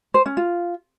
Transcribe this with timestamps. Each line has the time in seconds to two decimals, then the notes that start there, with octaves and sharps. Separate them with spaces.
0.14 C5
0.26 C#4
0.37 F4